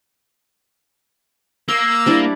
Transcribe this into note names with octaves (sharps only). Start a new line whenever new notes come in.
A#3 C6 E6
G3 D4 E4